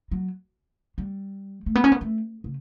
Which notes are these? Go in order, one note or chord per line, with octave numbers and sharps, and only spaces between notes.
F#3
G3
A3
B3
C#4
B3
A3
C#3